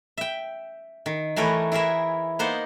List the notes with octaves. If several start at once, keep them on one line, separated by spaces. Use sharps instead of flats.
E5 G5
D#3
E3 A3 A#4 B4 C#5
E4 G#4 A#4 E5
A#3 B3 D#4 C5 F#5